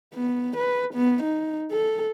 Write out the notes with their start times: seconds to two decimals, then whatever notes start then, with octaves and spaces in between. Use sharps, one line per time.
0.14 B3
0.56 B4
0.94 B3
1.22 D#4
1.71 A4